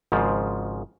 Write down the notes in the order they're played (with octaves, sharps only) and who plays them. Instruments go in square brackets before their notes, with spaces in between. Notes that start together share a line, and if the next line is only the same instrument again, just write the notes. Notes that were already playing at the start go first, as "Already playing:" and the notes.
[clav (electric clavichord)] G#1 G#2 C#3 F3